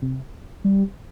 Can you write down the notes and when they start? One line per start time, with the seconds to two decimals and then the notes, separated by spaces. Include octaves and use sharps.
0.02 C3
0.64 G3